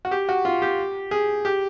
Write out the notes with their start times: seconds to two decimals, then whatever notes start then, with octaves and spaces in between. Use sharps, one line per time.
0.05 F#4
0.11 G4
0.29 F#4
0.45 F4
0.62 G4
1.11 G#4
1.45 G4